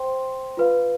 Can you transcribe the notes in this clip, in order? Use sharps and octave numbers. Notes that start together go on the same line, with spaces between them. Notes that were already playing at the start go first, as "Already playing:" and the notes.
Already playing: C5 G5 C6
F4 B4 F5